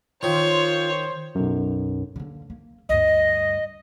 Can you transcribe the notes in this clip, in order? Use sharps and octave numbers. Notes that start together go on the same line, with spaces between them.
D#3 F4 C5 C#5
B1 F#2
D3 A#3
A#3
D2 G2 D#5